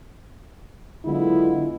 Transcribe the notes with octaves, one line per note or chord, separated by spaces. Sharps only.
D3 F#3 G#3 B3 E4 F4